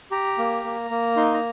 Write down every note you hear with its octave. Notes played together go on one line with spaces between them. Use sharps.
G4 A#5
A#3
A#3
A#3
D#4 C6
A#5